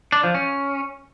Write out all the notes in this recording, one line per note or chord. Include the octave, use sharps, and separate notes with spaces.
D4
F3
C#4